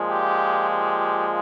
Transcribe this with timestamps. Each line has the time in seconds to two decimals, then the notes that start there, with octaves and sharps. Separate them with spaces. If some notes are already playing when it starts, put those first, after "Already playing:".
Already playing: A#2 F3 G#3
0.09 G4
0.70 G4